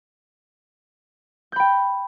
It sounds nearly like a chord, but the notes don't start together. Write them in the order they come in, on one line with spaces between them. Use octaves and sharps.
G6 B5 G5